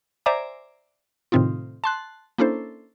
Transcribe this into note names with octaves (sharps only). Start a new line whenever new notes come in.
C5 D5 E5 G#5 A#5 D6
A2 C3 D#3 C4 D#4 F4
A5 C6 F#6
A#3 C#4 D4 E4 A4 C5